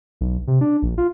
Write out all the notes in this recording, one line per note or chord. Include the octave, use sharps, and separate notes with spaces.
B1
C3
D4
A#1
F4